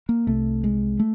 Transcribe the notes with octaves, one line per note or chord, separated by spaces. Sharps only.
A#3
C2 C3 A3
G#3
A3